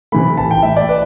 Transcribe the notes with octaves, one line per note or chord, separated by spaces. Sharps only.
C3 E3 A3 B5
A1 A5
G5
A2 E3 E5
D5
B4